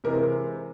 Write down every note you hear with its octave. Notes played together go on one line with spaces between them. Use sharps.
C3 E3 G#3 C4 A#4